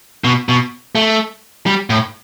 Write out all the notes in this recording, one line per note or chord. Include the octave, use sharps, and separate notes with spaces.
B2
B2
A3
G3
A2